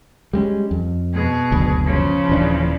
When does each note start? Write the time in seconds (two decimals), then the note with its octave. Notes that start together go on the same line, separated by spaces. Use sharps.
0.33 G3 G#3 C#4
0.71 F2
1.14 B2 G#4
1.52 F#1 D2
1.85 C#3 F3
2.29 D#1 E3 D4